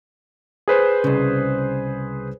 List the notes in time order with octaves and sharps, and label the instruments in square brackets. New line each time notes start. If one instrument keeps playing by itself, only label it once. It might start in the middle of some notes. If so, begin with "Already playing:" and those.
[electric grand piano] G#4 B4 C5
[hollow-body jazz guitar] C2 C#3